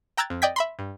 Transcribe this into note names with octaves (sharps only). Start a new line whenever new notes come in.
G5 A#5 E6 F#6 G#6 A6
F2
D5 D#5 G5 G#6 B6
E5 B5 C6
G2